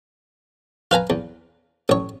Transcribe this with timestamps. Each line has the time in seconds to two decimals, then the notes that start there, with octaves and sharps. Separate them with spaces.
0.91 F4 B4 G#5 A#5
1.10 E2
1.89 A1 C#5